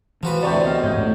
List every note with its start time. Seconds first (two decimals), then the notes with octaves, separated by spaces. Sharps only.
0.23 E3 F3 F#4 B4
0.43 D2 A2 C3 D5 C#6 G6
0.64 B3 D#5
0.83 G#2 C#5 G6
0.97 A2 A3